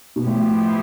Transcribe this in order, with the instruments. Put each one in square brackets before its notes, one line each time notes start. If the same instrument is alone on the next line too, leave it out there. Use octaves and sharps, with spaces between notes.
[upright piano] B2
[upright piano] A2 [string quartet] F3 B3 E4 G4